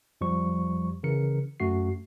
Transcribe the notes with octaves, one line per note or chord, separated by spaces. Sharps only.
F2 F3 G3 C#6
C#3 E3 A#4 C#7
F#2 A3 F#4 C7